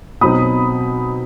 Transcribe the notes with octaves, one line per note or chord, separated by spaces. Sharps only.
B2 F#3 C4 D#4 B5 D#6